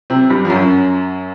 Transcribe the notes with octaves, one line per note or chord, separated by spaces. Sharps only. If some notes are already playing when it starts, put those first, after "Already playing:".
C3 C4
G2 G3
F3
F#2 F#3